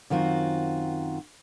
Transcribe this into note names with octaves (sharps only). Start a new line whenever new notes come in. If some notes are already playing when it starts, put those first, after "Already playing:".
F#2 D#3 C4 F4 F#4